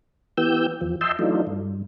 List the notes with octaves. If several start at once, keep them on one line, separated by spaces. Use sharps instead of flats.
E3 B3 G4 E6 G6
E2 F3
D#5 E5 G5 A5 C6 E6
E3 F#3 A3 D4 D#4 F4
G2